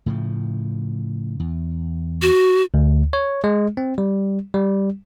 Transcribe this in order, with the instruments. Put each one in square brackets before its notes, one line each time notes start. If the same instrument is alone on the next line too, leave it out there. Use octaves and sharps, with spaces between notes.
[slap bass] A2 C#3 F3
E2
[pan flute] F#4
[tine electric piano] D2
C#5
G#3
C4
G3
G3